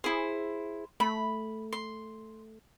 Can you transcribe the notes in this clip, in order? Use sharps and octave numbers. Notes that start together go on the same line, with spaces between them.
E4 G#4 C5
A3 B5
C6